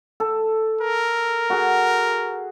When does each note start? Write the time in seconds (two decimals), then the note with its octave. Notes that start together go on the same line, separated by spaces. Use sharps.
0.20 A4
0.81 A#4
1.50 F#4 G#4